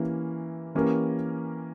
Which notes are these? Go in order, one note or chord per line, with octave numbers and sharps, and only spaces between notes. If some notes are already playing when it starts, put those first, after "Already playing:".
Already playing: E3 A#3 C#4 E4 G4
E3 A#3 C#4 G4 A#4